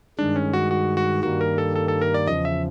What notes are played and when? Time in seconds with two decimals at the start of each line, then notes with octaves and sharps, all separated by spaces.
0.18 G2 D#3 G#3 D4
0.36 C#4
0.53 F#4
0.71 F#4
0.97 F#4
1.23 G2 D#3 G3 A#3 F#4
1.41 A#4
1.58 A4
1.76 A4
1.88 A4
2.01 A#4
2.14 D5
2.27 E2 C#3 F3 D#5
2.45 E5